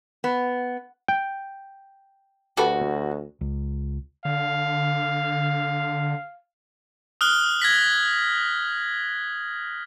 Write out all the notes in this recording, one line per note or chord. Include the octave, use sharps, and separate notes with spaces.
B3
G5
D2 F#4 G4 A4 B4
C#2
D3 F5
D#6 F6 F#6 G7
G#6 A#6 B6 F#7